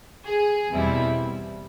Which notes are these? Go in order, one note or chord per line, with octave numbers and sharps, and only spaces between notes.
G#4
E2 B2 G3 C4 E4